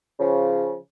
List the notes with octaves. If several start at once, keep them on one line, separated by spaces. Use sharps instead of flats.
C#3 F3